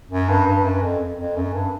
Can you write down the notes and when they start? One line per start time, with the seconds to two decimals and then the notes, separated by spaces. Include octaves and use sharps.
0.11 F#2
0.29 G2
0.47 G2
0.64 F#2
0.82 F2
1.18 F2
1.36 F#2
1.53 G2